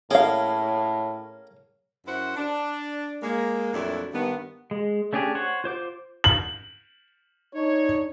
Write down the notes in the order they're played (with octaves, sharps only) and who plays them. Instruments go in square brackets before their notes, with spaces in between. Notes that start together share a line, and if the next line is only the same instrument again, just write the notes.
[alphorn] A2 [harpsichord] A#3 C#4 [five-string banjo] G#4 F5
[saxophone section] F#2 E4 F#4 C5 F#5
D4
G#3 A#3
F2 A#2 F#3 A3 D4 E4
G2 D#3 B3
[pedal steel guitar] G#3
A3 C#4 D4 G4 G#4
C5 C#5 F#5
F4 C5 D6 G6
[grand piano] F#7
[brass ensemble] D4 D#4 C#5